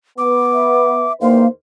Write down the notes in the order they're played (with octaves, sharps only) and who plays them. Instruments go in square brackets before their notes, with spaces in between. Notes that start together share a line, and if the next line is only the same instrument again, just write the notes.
[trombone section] B3 [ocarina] D6
[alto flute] E5
[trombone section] E2 D#3 C5 [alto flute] A#3 [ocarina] F5